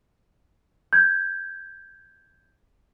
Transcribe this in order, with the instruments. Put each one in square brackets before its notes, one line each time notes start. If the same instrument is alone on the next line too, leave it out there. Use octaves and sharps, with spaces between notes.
[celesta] G6 G#6